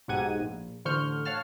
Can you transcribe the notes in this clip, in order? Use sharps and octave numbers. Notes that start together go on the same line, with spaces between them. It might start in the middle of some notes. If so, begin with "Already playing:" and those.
B1 G#2 G4 F#5 G#6 D#7
A#1
A1 D3 C5 C#6 F6 G6
C#5 F5 F#5 A5 F6